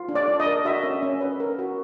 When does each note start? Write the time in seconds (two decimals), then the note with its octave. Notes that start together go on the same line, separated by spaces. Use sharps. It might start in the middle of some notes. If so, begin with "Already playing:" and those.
Already playing: F4
0.09 D4
0.15 D5
0.28 D4
0.40 D#5
0.46 A#4
0.65 F#4 E5
0.84 C#4
1.03 C#4
1.21 B4
1.40 A#4
1.59 F#4